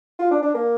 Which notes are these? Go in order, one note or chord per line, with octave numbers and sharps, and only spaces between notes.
F4
D4
D4
A#3